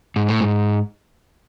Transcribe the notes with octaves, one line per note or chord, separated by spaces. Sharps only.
G#2
A2
G#2